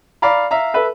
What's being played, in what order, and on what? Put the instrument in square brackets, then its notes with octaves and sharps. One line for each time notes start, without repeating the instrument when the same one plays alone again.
[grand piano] D5 F5 A#5 B5
E5 F5 A#5
A4 B4 E5